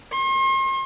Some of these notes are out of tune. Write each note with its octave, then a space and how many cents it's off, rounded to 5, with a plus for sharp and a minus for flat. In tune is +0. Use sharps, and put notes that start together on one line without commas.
C6 +40